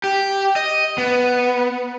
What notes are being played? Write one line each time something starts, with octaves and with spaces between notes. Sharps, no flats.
G4
D#5
B3